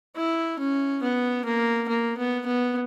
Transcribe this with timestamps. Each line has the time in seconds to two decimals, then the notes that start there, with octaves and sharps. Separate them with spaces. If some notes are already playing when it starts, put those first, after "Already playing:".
0.16 E4
0.59 C#4
1.02 B3
1.45 A#3
1.88 A#3
2.18 B3
2.46 B3